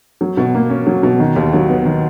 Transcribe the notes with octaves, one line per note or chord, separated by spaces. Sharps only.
F#3
B2
A#3
C#4
F#3
B2
D#3
D#2
F#3
B3
D#3